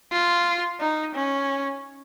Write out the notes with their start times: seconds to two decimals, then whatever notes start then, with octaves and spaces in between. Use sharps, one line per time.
0.12 F4
0.80 D#4
1.15 C#4